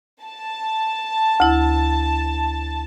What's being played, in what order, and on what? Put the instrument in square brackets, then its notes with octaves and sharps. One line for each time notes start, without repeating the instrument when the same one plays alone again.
[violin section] A5
[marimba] D2 E4